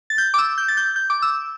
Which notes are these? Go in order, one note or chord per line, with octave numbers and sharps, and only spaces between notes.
A6
G6
D6
E6
G6
A6
G6
G6
D6
E6